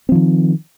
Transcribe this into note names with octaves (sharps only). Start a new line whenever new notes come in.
D#3 F3 C4